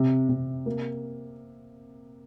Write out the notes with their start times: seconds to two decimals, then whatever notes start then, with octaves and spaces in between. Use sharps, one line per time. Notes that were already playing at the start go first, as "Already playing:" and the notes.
Already playing: C3
0.29 C3
0.66 A#3